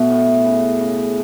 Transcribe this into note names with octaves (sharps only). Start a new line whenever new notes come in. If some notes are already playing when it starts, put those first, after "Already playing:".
Already playing: B2 A3
A2
C#3
C#3